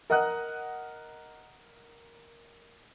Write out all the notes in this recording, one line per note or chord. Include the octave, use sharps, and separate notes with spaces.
A#4 D#5 F#5 D#6 F#6